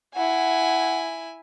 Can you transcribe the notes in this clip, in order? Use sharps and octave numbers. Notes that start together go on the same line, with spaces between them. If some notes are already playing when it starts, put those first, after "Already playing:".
E4 F#5 G#5